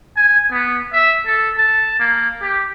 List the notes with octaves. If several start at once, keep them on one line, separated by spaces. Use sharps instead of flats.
G#5
B3
E5
A4
A5
A#3
G4